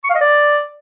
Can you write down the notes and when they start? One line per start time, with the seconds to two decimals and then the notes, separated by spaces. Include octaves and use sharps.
0.04 C#6
0.10 F5
0.15 D#5
0.21 D5